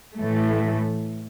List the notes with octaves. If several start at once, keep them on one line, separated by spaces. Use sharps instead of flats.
A2 E3 A3